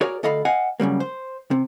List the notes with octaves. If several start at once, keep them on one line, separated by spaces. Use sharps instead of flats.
F#4 G#4 A#4 C#5 D5
D2 A4 D#5 F5 B5
D#5 F5 F#5 G#5
F#2 C#3 G3 A#3
C5
C3